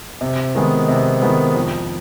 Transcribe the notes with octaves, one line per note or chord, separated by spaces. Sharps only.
C3
D#3 G#3 B3
C3
D#3 G#3 B3
F2